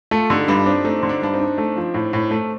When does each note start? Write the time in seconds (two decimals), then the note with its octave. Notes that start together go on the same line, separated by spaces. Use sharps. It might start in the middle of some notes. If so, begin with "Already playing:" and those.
0.11 A3 F4 A4
0.30 D3 D#4 G4
0.43 G4
0.48 G2 D4 F4
0.66 C4 D4 D#4
0.84 A3 C4 D#4
1.00 D3 C4
1.09 D4
1.22 G2 D4
1.34 C4 D#4
1.40 D4
1.58 A3
1.77 F3
1.94 A2
2.13 A2
2.31 A3